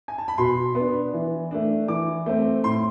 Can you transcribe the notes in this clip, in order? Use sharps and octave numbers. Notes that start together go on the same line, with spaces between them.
G#5
A5
B5
B2 C6
B3 D4
E3
A3 D4
E3 D6
A3 C4
A2 C6